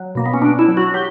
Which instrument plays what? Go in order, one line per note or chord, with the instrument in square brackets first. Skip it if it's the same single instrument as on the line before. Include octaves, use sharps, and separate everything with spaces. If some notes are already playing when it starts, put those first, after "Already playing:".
Already playing: [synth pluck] F#3
B2 A#3
B3
C#4
B2 D4
E4
F#3
F#4
F#3 G4